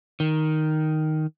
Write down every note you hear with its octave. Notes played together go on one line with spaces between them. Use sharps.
D#3